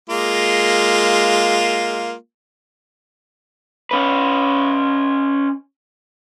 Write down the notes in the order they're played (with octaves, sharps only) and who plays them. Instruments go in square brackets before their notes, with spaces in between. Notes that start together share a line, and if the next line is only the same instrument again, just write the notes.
[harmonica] G#3 A#3 F4
[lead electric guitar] C#4 B4